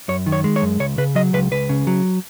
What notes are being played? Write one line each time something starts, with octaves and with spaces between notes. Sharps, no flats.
F#2 C#5
D#3
C#5
G#3
C#5
F#2
C#2 C#5
C#3 B4
F#3 D#5
C#2 B4
C#2 B4
C#3
F#3